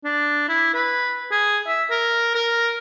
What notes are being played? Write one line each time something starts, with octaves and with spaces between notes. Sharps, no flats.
D4
E4
B4
G#4
E5
A#4
A#4